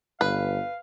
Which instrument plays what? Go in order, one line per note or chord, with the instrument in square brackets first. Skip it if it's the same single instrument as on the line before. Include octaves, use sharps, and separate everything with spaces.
[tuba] G1 [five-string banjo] B4 [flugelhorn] F5